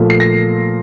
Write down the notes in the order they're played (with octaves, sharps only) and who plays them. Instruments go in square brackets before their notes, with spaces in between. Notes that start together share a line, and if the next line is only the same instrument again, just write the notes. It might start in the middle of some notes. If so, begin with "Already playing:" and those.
Already playing: [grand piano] A#2 F3 A3
C7
A#6